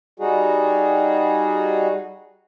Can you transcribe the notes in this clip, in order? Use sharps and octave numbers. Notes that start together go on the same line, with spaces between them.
G3 D#4 F#4 G#4